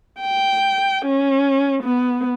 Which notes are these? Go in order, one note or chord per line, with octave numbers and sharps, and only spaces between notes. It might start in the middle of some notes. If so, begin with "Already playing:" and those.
G5
C#4
B3